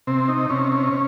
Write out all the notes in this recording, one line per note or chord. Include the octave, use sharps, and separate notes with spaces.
C3 C4
D#4
C3 C#4
C#4